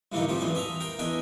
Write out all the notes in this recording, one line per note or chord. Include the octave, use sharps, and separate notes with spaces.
G2 D3 E3 F#3 A#3 D#4
C3 F3 G3 A3
A1 A#2 E3 G#4
D#5 E5 A5 A#5
A#4 G5 A#5 C6
E2 D4 D#5 E5 G#5